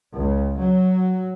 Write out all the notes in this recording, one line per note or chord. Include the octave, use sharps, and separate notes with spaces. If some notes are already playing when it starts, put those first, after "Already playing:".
C#2
F#3